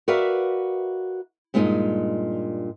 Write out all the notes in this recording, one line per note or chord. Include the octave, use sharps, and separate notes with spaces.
F#4 A#4 B4 D5 E5 F5
G2 A#2 G#3 D4 D#4